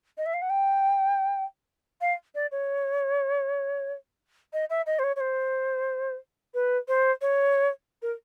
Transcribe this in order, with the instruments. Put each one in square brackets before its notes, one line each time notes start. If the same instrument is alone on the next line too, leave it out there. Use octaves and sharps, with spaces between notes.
[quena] D#5
E5
F5
F#5
G5
F5
D5
C#5
D#5
E5
D#5
C5
C#5
C#5
C5
B4
C5
C#5
A#4